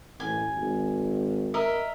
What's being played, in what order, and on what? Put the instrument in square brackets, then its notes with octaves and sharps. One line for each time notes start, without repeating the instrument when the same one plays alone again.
[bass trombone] A1 [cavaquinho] G#5
[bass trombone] G#1
[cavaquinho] A#4 D#5 E5